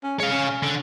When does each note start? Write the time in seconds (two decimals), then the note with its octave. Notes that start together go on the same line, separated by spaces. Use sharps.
0.04 C#4
0.20 G#3 C#5 F5
0.31 C#4
0.63 D3